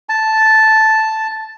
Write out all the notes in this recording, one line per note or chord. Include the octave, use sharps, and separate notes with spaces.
A5